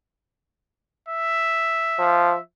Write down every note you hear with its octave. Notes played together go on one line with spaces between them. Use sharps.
E5
F3